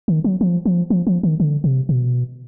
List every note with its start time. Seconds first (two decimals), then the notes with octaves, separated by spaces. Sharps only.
0.08 D#3
0.24 F#3
0.41 F3
0.66 F3
0.90 F3
1.07 F3
1.23 D#3
1.40 D3
1.64 C3
1.89 B2